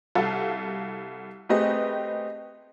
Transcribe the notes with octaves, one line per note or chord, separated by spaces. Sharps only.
C2 F#4 A4 F5
A3 C4 G4 G#4 B4 D#5